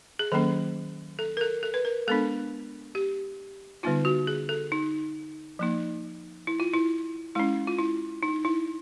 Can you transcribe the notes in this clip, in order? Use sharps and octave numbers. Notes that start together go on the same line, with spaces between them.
G#4
D#3 F#3 A#3 C#4 A4
A4
A#4
A4
A4
B4
A#4
G#3 B3 D4 A4
G4
D3 G3 B3 D#4 F4
F#4
G#4
A4
D#4
F3 A#3 D#4
E4
F4
E4
G#3 C#4 E4
F4
E4
D#4
E4